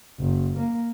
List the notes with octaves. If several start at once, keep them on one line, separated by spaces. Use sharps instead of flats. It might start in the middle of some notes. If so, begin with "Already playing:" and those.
F#1
A#3